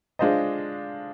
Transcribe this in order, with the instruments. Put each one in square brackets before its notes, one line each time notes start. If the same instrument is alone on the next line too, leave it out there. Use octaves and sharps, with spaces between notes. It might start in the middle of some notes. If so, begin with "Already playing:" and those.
[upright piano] G#3 D4 F4 C5 D#5